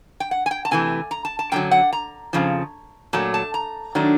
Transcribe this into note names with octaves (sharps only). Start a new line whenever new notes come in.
G5
F#5
G#5
G5
A5
C3 E3 A3 G#5
A#5
A5
A5
F#2 D3 F#3 G5
F#5
A#5
F2 C#3 F3
A#2 F#3 A3 A5
A5
A#5
D#3 F#3 A3 D4